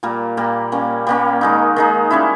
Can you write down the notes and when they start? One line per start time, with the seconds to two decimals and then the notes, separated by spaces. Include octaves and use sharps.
0.03 A#2 G3 A#3
0.37 A#2 G3 A#3
0.72 G3 A#3 C#4
1.07 G3 A#3 C#4
1.41 D#3 G#3 D#4
1.76 D#3 G#3 D#4
2.10 G3 C#4 E4